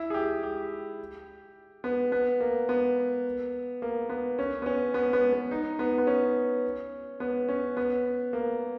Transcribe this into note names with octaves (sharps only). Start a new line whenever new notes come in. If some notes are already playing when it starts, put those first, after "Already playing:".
Already playing: E4
G#4
G4
G4
B3
B3
A#3
B3
A#3
B3
C#4
B3
C#4
B3
B3
B3
D#4
B3
B3
C#4
B3
C#4
B3
A#3